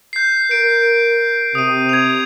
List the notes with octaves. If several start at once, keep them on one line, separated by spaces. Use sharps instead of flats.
G6 C7
A#4 D7
C3 D#6 D#7
G#6 F7